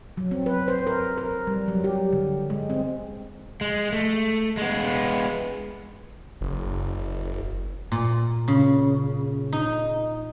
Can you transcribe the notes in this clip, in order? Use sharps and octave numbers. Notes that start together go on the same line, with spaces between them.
F#3
C4
B4
C5
A#4
A#4
G3
F#3
G4
D3
G#3
C4
G#3
A3
G#3 B3
F#1
A#2
C#3
D#4